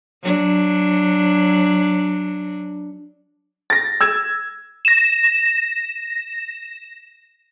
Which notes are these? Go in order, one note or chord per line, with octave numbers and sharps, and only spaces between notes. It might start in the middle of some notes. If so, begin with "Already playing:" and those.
F#3 D4
A6 A#6
E6 G#6 E7
A#6 E7